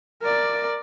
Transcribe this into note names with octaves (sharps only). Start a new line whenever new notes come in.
A#4 D5